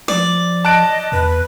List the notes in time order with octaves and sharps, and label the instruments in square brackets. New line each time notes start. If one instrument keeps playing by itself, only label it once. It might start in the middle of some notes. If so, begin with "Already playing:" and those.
[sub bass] F3 [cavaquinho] D5
[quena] D#5 [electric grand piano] A5 F#6 D7
[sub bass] E2 [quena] B4